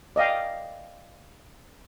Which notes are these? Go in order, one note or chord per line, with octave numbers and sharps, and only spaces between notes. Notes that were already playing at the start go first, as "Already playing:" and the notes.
D5 D#5 F5 G5